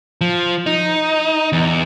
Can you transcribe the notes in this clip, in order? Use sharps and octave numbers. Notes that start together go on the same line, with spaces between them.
F3
D#4
E2